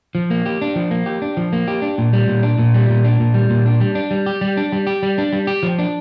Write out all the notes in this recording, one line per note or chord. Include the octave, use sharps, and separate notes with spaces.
F3
A#3
G4
D4
F3
A#3
G4
D4
F3
A#3
G4
D4
A#2
G3
A#2
D4
A#2
G3
A#2
D4
A#2
G3
A#2
D4
G3
D4
G3
G4
G3
D4
G3
G4
G3
D4
G3
G4
F3
D4